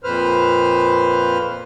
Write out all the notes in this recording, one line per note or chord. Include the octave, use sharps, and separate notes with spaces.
F2 A#2 B4 C5 F6